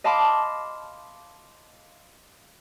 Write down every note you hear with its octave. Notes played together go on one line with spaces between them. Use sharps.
D#5 F5 A5 B5 C6 D6